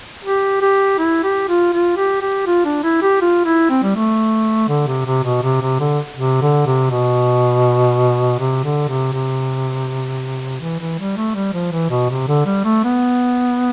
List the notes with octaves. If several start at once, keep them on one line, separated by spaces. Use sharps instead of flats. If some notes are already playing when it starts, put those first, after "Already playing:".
G4
G4
E4
G4
F4
F4
G4
G4
F4
D4
E4
G4
F4
E4
C4
G3
A3
D3
C3
C3
B2
C3
C3
D3
C3
D3
C3
B2
C3
D3
C3
C3
E3
E3
G3
A3
G3
F3
E3
B2
C3
D3
G3
A3
B3